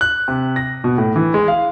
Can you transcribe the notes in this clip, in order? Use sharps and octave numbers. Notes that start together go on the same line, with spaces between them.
F#6
C3
A#6
B2
A2
E3
G#3
F5